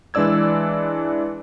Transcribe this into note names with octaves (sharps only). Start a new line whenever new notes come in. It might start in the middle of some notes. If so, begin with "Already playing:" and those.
E3 G#3 D4 D5 E6 G#6